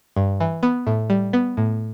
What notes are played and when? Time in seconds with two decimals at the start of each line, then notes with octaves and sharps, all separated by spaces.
0.16 G2
0.40 E3
0.63 B3
0.87 A2
1.10 G3
1.33 B3
1.57 A2